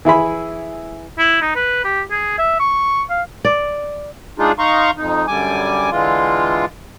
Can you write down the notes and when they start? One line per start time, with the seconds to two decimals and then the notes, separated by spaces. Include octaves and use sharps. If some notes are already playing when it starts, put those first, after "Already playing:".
0.05 E3 E4 G#4 B5
1.19 E4
1.42 D#4
1.56 B4
1.85 G4
2.11 G#4
2.39 E5
2.60 C#6
3.10 F5
3.45 D5
4.39 G#3 D4 D#4 F4 G#4
4.59 D#4 F5 A#5 C6 C#6
4.97 F2 D#4
5.27 F#2 D3 G3 G#5 D6
5.91 D3 E3 G#3 F4